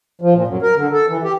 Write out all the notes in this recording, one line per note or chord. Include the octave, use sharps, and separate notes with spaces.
F3
A#2
F#2
A#4
D3
A4
E3
G4